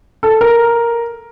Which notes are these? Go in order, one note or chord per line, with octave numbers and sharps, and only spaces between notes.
A4
A#4